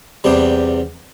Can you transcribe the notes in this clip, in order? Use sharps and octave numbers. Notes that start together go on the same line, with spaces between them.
E2 C3 G3